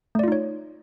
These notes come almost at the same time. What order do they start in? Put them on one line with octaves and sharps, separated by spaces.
A3 D5 F4 D#4 C#5